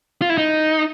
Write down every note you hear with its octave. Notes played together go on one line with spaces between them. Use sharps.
F4
E4
D#4